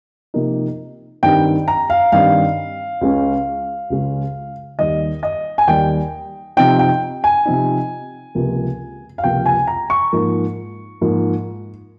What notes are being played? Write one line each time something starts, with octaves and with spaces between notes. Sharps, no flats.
C3 F3 A#3 D#4
G2 D#3 G3 C4 D#4 G5
A#5
F5
G2 D#3 G3 C4 D#4 F5
C#2 C#3 G#3 C#4
C#2 C#3 G#3 C#4
D#2 D#3 G3 D#5
D#5
G#5
D#2 D#3 G3 G5
C3 F3 C4 D#4 G5
G5
G#5
C3 F3 C4 D#4
C#2 C3 F3 A#3
F5
C#2 C3 F3 A#3 G5
G#5
A#5
C#6
G#2 F3 A#3
G#2 F3 A#3